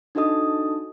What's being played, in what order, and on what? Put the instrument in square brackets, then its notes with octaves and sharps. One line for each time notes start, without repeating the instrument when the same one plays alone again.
[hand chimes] D4 D#4 F#4 A4 D#5 D#6